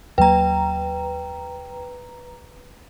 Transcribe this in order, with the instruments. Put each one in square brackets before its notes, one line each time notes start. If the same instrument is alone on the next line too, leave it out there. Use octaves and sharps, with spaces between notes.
[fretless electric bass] D#2 F#3 A#3 [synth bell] B4 A#5 [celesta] G5